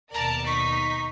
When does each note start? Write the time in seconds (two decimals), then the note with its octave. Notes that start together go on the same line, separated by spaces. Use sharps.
0.14 D#2 B2 A#4 D5 A5 A#5
0.46 D#4 C#6 B6